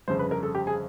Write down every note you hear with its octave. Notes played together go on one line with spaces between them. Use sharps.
G1 F2 C#3 C5
B4
A#4
A4
G4
G#4